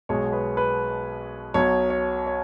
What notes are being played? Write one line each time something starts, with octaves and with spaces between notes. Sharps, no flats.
B1 B2 G#3 C#5
B4
B4
B1 B2 F#3 C#5
C#5
C#5